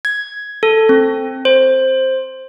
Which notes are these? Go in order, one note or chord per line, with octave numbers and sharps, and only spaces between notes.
G#6
A4
C4
C5